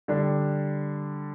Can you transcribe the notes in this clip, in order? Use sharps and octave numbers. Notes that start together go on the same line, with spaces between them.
D3 G3 D4